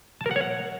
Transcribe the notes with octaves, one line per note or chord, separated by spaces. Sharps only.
A5
A#4
F#5
C#5
F#5